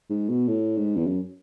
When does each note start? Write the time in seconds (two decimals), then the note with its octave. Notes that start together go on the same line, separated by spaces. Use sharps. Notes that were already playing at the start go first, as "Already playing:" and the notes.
0.09 G#2
0.29 B2
0.48 A2
0.77 G#2
0.96 E2
1.07 F#2